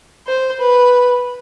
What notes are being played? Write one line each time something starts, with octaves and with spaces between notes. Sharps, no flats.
C5
B4